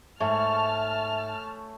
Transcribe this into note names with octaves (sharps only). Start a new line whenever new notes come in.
G#2 A3 C#5 E5 G#5 A5 F6